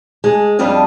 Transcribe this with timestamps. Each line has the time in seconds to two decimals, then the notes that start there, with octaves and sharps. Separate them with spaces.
0.24 G#3
0.59 F2 G3 D4 F4 D#5